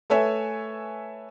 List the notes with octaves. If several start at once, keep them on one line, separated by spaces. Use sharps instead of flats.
A3 A4 B4 C#5 E5 G#5